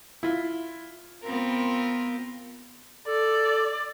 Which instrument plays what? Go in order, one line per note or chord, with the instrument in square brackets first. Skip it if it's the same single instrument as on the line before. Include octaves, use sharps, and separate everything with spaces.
[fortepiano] E4 F4
[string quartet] B3 C4 F4 A#4
[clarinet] A4 [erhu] D5